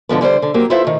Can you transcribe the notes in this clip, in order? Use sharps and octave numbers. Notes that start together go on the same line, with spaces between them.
G#2 D3 F3 B3
D3 G3 A4 C5
D3
F#3 A#3 C4 G4
E4 F4 A4 B4 C5 E5
A2 D#3